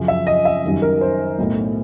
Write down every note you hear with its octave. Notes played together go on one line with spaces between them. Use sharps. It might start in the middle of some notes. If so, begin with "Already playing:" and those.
Already playing: F#2 C#3 F3
E5
D#5
E5
F#2 D#3 G3
A#4
C5
B1 A2 F#3